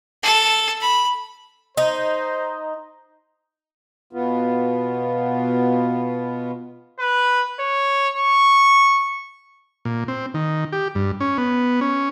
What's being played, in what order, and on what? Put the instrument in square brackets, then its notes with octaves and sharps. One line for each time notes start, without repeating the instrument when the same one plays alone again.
[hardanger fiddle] A4
B5
[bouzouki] D#4 [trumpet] C5
[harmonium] B2 B3 F4
[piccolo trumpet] B4
C#5
C#6
[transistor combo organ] A#2
C4
D#3
G4
G2
C#4
B3
C#4